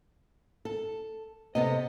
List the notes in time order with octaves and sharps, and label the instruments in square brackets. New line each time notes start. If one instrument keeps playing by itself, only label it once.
[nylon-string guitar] A4
[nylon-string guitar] C3 B3 A4 [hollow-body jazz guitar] D#5